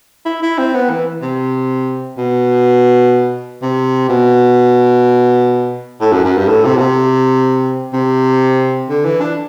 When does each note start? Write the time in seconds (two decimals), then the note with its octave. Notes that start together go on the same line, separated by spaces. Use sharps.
0.25 E4
0.43 E4
0.58 C4
0.75 B3
0.90 E3
1.22 C3
2.18 B2
3.62 C3
4.09 B2
6.01 A2
6.13 F#2
6.24 F#2
6.37 G2
6.48 A2
6.65 C3
6.76 B2
6.80 C3
7.93 C3
8.89 D3
9.05 E3
9.21 D4